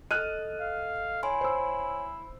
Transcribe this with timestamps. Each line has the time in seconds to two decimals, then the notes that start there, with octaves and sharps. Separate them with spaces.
0.11 A4 D#5 F6 F#6 D#7
0.60 F5
1.23 E4 C#5 G#5 C6
1.41 C5 E6